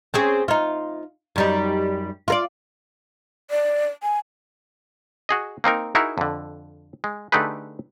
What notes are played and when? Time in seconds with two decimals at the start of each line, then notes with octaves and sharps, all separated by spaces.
0.14 C4 C#4 G#4
0.48 D#4 F4
1.36 F#2 G3 D#4
2.28 F4 A#4 D5
3.51 D5
4.03 G#5
5.29 F#4 G#4 D#5
5.64 A#3 C4 D#4 A#4
5.95 D#4 E4 F#4 G#4 A#4
6.18 F2 D3
7.04 G#3
7.32 D3 A3 D#4 G4 G#4 B4